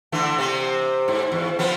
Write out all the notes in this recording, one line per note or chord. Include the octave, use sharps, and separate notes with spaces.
D3 E3 A3
C3 C4
G#2
E2
F3 B3 C4